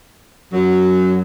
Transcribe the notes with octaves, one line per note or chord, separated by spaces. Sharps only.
F#2 F#3